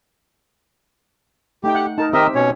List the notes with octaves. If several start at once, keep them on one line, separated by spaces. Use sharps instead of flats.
A3 D#4 G4 G5
F#5
D#4 A#4 A5
D#3 C4 G4 A#4 D#5 E5
B2 C#4 C#5